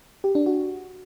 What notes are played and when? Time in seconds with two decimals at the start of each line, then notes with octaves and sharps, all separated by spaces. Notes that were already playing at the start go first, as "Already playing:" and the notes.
0.24 G4
0.35 D4
0.46 F#4